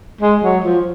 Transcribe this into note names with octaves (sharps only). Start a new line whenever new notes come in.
G#3
F#3
F3